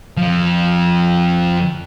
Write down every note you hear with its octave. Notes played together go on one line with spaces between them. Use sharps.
F2 F3